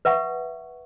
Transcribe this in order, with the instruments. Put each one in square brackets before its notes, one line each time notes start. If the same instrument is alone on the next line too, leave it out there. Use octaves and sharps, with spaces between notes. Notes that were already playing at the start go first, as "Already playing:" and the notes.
[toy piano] B4 E5 F#5 C#6